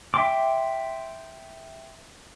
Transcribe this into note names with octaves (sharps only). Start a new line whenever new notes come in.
E5 G5 C6 D6